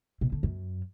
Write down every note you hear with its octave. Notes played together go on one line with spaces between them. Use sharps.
B2
D3
F#2